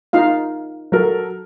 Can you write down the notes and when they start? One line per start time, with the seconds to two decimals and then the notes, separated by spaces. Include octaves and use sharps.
0.13 D#4 F4 F5
0.92 F#3 A4 A#4